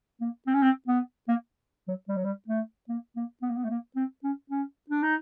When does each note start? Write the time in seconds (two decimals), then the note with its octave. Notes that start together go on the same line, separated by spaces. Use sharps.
0.21 A#3
0.47 C4
0.54 C#4
0.62 C4
0.88 B3
1.28 A#3
1.88 F#3
2.09 G3
2.17 F#3
2.24 G3
2.48 A3
2.89 A#3
3.16 A#3
3.42 B3
3.50 A#3
3.57 B3
3.65 A3
3.70 A#3
3.96 C4
4.24 C#4
4.50 C#4
4.90 D4
5.03 D#4